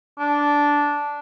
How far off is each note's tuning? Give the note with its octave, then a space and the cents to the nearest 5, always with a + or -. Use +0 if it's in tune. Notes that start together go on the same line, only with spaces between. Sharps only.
D4 -10